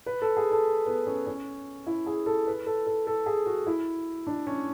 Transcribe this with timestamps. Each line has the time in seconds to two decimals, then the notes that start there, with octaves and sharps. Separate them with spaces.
0.06 B4
0.22 A4
0.37 G#4
0.51 A4
0.86 B3
1.07 C#4
1.27 C#4
1.87 E4
2.06 G#4
2.26 A4
2.47 B4
2.66 A4
2.87 A4
3.07 A4
3.26 G#4
3.46 F#4
3.67 E4
4.27 D4
4.47 C#4